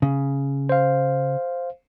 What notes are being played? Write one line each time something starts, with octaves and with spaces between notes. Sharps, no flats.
C#3
C5 F5